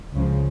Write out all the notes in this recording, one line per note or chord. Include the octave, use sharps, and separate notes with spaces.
C#2 C#3 F3